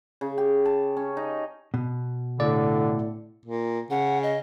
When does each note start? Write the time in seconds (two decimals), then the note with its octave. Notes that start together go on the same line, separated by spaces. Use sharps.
0.21 C#3
0.38 G4
0.65 A5
0.97 C#4
1.17 D#4
1.74 B2
2.40 A2 D3 D5
3.45 A#2
3.90 C#3 F#5
4.23 D#5